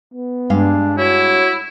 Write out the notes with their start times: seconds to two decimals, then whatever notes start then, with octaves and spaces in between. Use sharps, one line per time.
0.14 B3
0.50 G2 G#3 D4 F5
0.98 E4 F#4 C#5